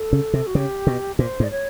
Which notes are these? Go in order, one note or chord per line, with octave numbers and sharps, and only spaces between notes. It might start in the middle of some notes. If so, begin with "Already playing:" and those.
Already playing: A4
C#3
C3
F#4
C#3 G4
B2
A#2 C5
G#2
D5
C#5